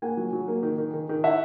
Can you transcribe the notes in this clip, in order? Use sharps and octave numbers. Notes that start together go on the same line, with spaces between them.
A#3 F#5 G#5
F#3
F#3
A#3
D#3
D#3
D#3
D#3
E4 E5 F#5